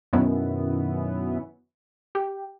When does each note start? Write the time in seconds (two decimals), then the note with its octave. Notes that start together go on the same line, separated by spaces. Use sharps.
0.13 F#2 B2 D#3 B3 C#4 E4
2.15 G4